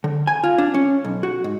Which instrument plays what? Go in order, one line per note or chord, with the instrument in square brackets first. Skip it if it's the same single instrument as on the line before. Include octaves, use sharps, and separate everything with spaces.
[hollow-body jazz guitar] D3
G#5
F4
D4
C#4
B1
F#4
G#2